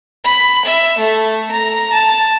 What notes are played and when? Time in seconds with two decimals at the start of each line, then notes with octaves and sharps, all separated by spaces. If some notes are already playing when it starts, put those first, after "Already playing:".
0.25 B5
0.65 E5
0.98 A3
1.51 A#5
1.92 A5